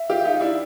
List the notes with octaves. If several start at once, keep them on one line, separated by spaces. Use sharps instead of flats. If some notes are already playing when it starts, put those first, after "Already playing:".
Already playing: E5
F4 G4
D#4 F4
D4 E4